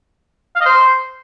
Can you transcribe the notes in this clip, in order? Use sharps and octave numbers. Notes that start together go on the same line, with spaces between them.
F5
D#5
C5